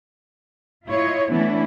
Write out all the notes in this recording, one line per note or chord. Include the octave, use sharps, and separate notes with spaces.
E4 F4 C#5 D#5
E3 A3 B3 C#4 D4 E4